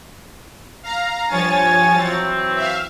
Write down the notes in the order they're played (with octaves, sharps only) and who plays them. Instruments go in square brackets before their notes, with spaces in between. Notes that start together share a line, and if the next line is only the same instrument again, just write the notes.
[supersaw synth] F5 A#5
[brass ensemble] G2 G#5 [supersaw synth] F3 C#5 A6
[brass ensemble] E3 F#3 C4
[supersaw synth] E5 F5